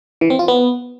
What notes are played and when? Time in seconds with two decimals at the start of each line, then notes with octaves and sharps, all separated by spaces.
0.21 E3
0.30 C4
0.39 F4
0.48 B3